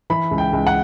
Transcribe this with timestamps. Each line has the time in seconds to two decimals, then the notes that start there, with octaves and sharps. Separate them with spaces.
0.10 E3 B5
0.31 C#2
0.38 G5
0.53 C#2
0.67 F#5